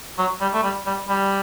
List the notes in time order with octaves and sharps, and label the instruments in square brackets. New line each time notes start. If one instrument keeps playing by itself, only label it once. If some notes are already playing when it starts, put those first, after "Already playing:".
[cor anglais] F#3
G3
A3
G3
G3
G3